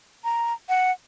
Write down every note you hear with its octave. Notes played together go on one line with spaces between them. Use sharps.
A#5
F#5